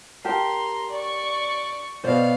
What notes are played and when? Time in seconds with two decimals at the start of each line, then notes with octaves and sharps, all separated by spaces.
0.25 G4 A#4 A5 A#5 C6
0.89 D5 C#6
2.04 B2 C5 D5 F5